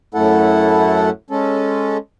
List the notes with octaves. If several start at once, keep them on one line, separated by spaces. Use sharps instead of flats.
F#2 A2 A3 E4 A4 F#5
G#3 C#4 A4